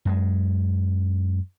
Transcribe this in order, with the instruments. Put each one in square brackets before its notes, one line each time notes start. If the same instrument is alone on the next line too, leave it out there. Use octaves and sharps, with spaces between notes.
[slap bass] F#2 G#3